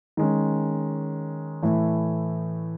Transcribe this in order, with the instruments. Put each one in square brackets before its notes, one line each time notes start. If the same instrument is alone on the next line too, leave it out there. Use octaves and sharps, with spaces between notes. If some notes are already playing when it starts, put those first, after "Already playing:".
[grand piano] D#3 G#3 C#4
A2 E3 A3 E4